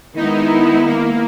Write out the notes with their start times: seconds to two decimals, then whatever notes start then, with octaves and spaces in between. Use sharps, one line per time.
0.16 D#3 G#3 B3 D#4 E4
0.86 A#3